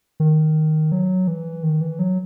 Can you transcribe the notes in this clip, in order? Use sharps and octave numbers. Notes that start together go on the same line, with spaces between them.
D#3
F#3
E3
D#3
E3
F#3